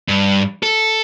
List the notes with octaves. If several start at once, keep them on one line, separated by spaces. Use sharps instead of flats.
G2
A4